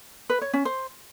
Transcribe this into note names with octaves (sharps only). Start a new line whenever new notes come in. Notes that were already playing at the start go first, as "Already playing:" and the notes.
B4
C#5
C#4
C5